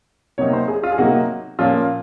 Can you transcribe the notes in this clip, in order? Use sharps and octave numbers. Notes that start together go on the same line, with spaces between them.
C3 F#3 A#3 D#4 C#5
C5
G#4
F4
G#4
C3 F#3 A#3 D#4 F#4
A#2 F3 A#3 C#4 F4